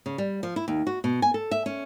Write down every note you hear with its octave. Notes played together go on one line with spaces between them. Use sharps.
C#3
G3
F3
E4
D#2
F#4
B2
G#5
A4
E5
C#4